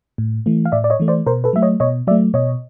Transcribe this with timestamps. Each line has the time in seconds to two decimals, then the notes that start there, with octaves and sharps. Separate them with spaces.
0.18 A2
0.46 E3 A3
0.65 F5
0.72 A2 D5 E5
0.84 D5
0.90 C#5 D#5
1.00 E3 A3
1.08 C5 D5
1.26 B2 A#4 C5
1.44 A4 B4
1.53 F#3 A3 E5
1.62 C#5 D#5
1.80 B2 C#5 D#5
2.07 F#3 D5 E5
2.11 A3
2.34 B2 C#5 D#5